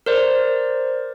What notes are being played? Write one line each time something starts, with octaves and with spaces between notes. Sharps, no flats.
A#4 C5 D5